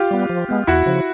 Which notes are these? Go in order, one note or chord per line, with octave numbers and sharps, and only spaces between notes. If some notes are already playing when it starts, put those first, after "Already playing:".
Already playing: F4 G4
G3 B3
F3
G#3 B3
E2 E4 F#4
C#3 F3